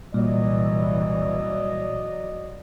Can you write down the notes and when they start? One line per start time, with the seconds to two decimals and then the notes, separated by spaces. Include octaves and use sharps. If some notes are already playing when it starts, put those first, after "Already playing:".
0.14 C2 A#2 E3 F#3 G3 D5 D#5